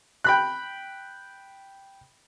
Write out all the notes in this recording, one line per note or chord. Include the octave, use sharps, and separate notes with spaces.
G5 B5 F#6